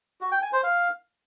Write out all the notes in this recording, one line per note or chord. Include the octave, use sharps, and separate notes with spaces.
F#4
G5
G#5
C5
F5